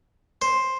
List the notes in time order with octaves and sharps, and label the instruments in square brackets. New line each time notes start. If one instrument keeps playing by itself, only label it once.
[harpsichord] C5